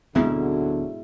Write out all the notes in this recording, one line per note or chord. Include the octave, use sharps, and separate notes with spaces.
D1 G#2 B2 D3 F#3 B3 C4 E4